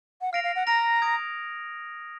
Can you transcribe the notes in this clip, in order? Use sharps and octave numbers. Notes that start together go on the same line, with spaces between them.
F#5
F5 F6 A#6 D7 F7
F5
F#5
A#5 F6 A#6 D7 F7
D#6 G#6 D7